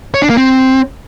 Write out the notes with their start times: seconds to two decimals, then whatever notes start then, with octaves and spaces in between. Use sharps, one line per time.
0.14 C#5
0.22 D4
0.30 A#3
0.37 C4